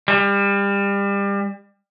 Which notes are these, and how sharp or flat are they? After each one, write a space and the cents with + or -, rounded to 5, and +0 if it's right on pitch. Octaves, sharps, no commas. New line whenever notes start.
G3 +30